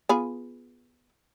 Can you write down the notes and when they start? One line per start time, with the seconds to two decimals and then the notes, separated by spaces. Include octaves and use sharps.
0.09 B3 F4 G#4